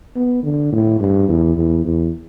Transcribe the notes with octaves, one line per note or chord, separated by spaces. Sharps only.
B3
D3
A2
G2
E2
E2
E2